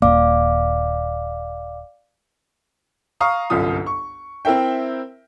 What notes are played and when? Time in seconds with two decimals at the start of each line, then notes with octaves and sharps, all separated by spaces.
0.02 D#1 F2 A#3 D5 F5 D6
3.21 F5 A#5 C#6 D#6
3.50 G1 C2 F#2 F4 D#6
3.86 C#6
4.45 C4 E4 A#4 E5 G5